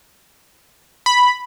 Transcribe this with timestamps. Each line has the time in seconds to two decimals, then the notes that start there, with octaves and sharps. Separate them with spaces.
1.06 B5